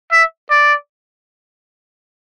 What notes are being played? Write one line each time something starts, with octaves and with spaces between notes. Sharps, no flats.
E5
D5